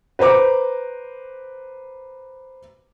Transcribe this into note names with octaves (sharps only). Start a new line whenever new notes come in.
B4 C5 A#5 D6